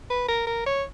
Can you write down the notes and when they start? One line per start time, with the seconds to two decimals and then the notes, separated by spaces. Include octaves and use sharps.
0.10 B4
0.28 A#4
0.47 A#4
0.66 C#5